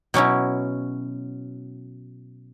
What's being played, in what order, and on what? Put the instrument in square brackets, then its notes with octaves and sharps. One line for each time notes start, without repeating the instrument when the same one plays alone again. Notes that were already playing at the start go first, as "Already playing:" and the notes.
[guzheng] B2 F#3 C#4 E4